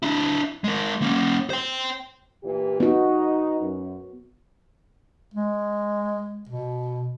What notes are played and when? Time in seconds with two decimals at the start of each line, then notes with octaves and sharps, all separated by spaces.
0.03 D4 E4
0.64 G#3 A#4
1.02 A#3 C#4
1.50 C5 G5
2.42 A#2 E3 G4
2.80 B3 D#4 F#4
3.60 F#2
5.34 G#3
6.49 B2